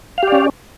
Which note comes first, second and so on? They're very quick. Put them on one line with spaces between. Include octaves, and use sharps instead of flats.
F5 G4 D5 C#4